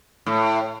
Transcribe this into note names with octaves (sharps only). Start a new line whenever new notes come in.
A2